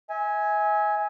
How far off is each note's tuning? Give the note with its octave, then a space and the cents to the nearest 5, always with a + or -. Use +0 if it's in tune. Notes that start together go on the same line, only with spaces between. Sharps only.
E5 -35 G#5 +0